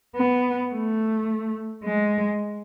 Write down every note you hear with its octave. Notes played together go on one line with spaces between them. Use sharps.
B3
A3
G#3